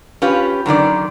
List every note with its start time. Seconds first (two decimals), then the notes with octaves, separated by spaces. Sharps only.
0.22 C#4 F4 G4 B4
0.66 F#2 D3 D#3 D5